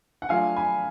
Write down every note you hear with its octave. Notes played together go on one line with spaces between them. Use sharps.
F#5
F#3 A3 D4 F4 F5 G#5
G#5 B5